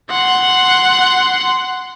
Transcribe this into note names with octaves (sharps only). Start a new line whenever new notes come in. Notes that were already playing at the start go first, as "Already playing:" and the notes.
F#5 C6